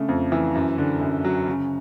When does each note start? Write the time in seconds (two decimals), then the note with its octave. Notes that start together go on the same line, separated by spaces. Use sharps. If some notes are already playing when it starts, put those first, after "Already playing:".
Already playing: C#3 A3 D4
0.09 F2
0.32 E3
0.55 F#2
0.78 D3
1.01 F#2
1.25 F#3
1.48 C#3